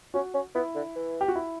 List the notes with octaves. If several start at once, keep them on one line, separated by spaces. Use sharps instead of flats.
C#4 F#4
C#4
B3 E4
D3
E3
G4
F#4
E4